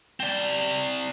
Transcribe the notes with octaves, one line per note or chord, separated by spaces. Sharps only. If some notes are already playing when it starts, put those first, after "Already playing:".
C4 D5